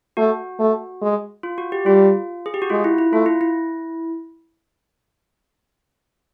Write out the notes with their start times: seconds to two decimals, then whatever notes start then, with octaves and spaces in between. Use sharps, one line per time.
0.17 A3 F#4
0.59 A3
1.02 G#3
1.43 F4
1.58 F#4
1.72 G4
1.85 G3 F4
2.46 G#4
2.54 G4
2.62 F#4
2.70 G#3 F4
2.84 E4
2.98 E4
3.13 A3 F4
3.26 E4
3.41 E4